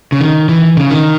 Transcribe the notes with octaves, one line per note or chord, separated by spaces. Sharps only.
C#3
D#3
E3
C#3
D#3